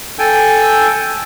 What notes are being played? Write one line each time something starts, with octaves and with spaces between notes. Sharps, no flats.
A4 G5 G#5